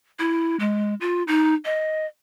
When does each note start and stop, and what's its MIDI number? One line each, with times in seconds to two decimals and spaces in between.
0.19 0.56 64
0.60 0.94 56
1.01 1.23 65
1.27 1.54 63
1.65 2.06 75